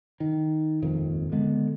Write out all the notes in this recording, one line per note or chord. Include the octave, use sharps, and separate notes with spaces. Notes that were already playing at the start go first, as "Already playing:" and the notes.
D#3
D#1 G#1 F2 D#3
D3 G#3 B3